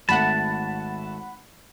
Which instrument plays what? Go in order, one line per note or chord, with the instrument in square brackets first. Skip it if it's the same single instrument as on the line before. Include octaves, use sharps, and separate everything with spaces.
[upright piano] G#1 A3 [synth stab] F#5 B5 [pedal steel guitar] A5